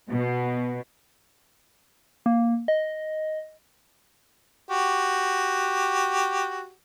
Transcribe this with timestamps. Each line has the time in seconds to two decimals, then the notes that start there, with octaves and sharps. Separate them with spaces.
0.11 B2
2.26 A#3
2.68 D#5
4.69 F#4 G4